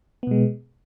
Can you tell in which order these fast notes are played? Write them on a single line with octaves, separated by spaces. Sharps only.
B3 B2 G#3